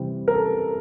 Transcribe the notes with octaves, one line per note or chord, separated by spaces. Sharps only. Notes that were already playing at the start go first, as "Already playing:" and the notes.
Already playing: C3 E3 G3 C4
A#4
A4